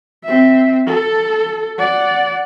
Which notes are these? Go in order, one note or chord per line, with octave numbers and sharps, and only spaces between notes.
C4 E5
A4
D5 F#5